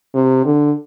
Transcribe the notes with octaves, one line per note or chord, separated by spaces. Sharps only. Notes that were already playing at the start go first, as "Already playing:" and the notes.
C3
D3